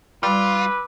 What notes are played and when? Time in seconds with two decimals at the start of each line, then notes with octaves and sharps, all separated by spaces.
0.23 G3 F4 B4 D6 E6